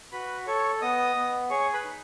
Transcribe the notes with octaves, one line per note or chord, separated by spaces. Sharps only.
F#4 B4 B5
A4 C#5 C#6
B3 D#5 D#6
B3
G#4 C#5 C#6
B4 B5
D#4